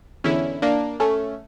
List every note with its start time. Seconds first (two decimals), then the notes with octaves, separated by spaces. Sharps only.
0.24 E2 D3 C#4 E4
0.62 A#3 D4
1.00 A3 C#4